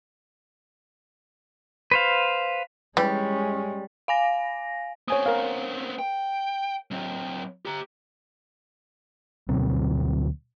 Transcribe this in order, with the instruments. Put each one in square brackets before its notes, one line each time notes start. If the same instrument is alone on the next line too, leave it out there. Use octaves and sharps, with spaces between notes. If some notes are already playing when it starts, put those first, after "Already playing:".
[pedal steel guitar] B4 C5 F5
[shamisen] E3 [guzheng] G3 [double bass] G#3 C#4
[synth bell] F5 G#5 A#6
[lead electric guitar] B3 C4 [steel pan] C#5 G#5 D#6
[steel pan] A#4 F5
[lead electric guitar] G5
F#3 C4
G4 A#5
[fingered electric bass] D2 B2 F#3 C4